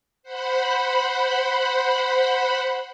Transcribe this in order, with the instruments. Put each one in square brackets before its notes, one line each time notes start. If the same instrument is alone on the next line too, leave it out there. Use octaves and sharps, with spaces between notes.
[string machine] C5 F#5 B5